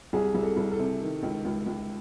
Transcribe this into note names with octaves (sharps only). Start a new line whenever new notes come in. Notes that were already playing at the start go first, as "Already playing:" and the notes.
C2 G#4
C2
A4
C2
A4
C3
D#3
C#2
C#2
C#2